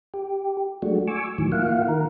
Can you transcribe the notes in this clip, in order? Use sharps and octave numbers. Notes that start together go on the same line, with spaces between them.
G4
F#3 G#3 A3 D4 F#4
G#5 C#6 D6 E6
A2 D#3 E3 F#3
A#3 E4 F4 F5 F#5
D#3 A#4